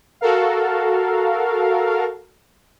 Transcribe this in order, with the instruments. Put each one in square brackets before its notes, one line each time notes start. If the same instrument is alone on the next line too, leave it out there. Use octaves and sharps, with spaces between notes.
[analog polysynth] F#4 A4 A#4 F5